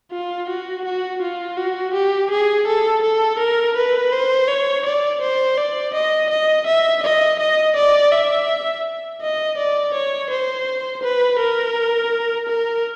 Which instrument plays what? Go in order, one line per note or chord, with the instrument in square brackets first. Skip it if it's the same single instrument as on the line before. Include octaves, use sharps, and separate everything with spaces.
[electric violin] F4
F#4
F#4
F4
F#4
G4
G#4
A4
A4
A#4
B4
C5
C#5
D5
C5
D5
D#5
D#5
E5
D#5
D#5
D5
E5
D#5
D5
C#5
C5
B4
A#4
A#4